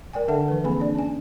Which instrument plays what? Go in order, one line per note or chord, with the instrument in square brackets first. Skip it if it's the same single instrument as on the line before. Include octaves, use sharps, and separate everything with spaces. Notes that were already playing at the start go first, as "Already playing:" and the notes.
[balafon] A#4 D5 G5 G#5
D3 D4 A4 E5 F#5 A5
E3 B4
F3 A#3 C4 G#4 G#5 B5
D4 D5
C#4 G#5